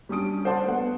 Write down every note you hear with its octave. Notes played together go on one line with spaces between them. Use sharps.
G3 C#4 D4 D#6 D7
C5 D5 F#5 A5 C6
A3 B3 F#5